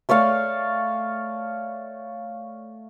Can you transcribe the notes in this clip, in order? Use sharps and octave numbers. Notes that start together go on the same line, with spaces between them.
A3 C#5 D5 F5